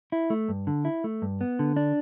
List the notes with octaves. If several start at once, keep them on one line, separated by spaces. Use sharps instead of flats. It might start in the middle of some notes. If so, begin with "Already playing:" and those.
E4
A3
G2
D3
E4
A3
G2
B3
D3
D4